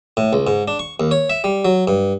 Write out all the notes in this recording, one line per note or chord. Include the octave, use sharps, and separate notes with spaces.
A2
C#2
G#2
D4
C#6
D#2
C#5
E5
G3
F#3
G2